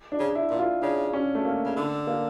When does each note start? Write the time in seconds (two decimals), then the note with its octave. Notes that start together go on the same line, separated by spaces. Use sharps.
0.12 D4
0.19 C#3
0.35 E4
0.50 A#2
0.59 F4
0.82 C#3 D4
1.13 C#4
1.35 A3
1.45 A#3
1.65 C#3
1.76 D3 D4
2.07 A#3